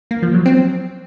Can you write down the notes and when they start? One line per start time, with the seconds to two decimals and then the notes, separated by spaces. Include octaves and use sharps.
0.11 A#3
0.22 F3
0.34 F#3
0.46 C4